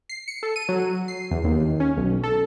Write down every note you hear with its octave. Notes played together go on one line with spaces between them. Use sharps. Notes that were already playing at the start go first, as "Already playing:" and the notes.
C7
C#7
A4
D#7
F#3
F#3
C7
E2
D#2
C#4
B1
A4